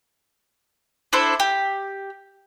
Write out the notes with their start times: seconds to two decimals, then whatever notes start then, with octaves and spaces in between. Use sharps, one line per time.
1.13 D4 E4 A4 C5
1.40 G4